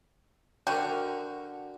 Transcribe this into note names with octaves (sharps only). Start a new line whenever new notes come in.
D3 F#4 A#4 G5